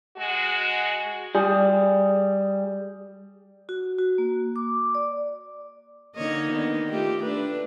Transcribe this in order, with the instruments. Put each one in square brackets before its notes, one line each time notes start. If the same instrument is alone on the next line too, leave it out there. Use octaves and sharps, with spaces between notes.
[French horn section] G#3 F#4
[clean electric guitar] G3 G#4
[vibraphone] F#4
F#4
A#3
D6
D5
[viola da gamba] D3 C#5 D#5 [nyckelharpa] A#3 D#4
[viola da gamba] D#3 B3 D4
[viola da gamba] A3 F4 [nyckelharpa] G4
[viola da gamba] A3 D4 [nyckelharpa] B4